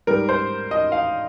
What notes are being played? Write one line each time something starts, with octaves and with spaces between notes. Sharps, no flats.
G#2 G3 A#4
C5
D#5
F5